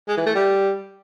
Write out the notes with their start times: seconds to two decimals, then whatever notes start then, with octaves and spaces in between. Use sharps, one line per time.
0.08 G#3
0.17 E3
0.26 A3
0.35 G3